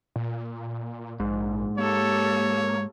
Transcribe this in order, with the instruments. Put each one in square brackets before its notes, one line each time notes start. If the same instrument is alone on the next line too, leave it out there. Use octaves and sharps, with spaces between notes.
[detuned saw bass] A#2
[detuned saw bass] A#1 [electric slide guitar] G#2
[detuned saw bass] A#3 [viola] G4 A4 [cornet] C#5